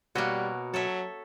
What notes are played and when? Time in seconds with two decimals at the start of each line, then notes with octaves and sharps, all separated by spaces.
0.15 B2 G3 A#3 F#4 C#5
0.74 F#3 A4 C#5 E5